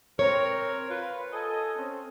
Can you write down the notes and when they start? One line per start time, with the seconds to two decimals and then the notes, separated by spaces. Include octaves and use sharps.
0.19 C4 A#4 C#5
0.90 F4 B4
1.32 A4 D#5 G#5
1.77 C4 C#4